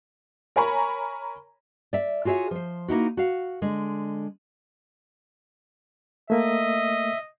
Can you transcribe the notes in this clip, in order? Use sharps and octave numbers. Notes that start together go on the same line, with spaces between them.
A#4 C#5 G#5 A#5 B5 C#6
D5 E5
F4 F#4 G#4 C#5 E5
F3 C5
A#3 D#4 E4 F#4
F#4 F5
D3 G#3
A3 A#3 D#5 E5